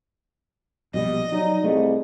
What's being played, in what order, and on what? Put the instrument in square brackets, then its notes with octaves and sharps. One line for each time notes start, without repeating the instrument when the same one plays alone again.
[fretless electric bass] A#1 B2 G3 [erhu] D#5
[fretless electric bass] F#3 [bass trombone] D#4 [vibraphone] D5
[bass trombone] C2 [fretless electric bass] A3 [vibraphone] C4 G#4 D#5